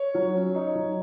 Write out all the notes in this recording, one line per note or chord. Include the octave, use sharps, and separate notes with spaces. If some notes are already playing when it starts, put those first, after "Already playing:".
Already playing: C#5
F#3
C#4
D#4
F#3